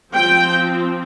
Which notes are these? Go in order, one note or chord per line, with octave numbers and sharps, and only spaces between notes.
F3 C4 G5